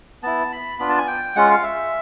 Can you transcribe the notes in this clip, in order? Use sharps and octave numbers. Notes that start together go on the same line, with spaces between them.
B3 E4 A5
B5
B3 D4 F4 B5
A5
G#5
G5
G#3 C#4 F4 F#5
F5
E5